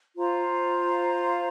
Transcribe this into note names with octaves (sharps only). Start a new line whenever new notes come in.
F4 C5 F5 A#5